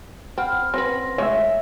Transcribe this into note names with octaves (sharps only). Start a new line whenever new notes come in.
C4 F#5 B5 F6
C4 C#4 B4 C6 A#6
G#3 A3 C#5 E5